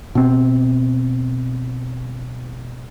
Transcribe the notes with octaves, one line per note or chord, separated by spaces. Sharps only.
B2 C4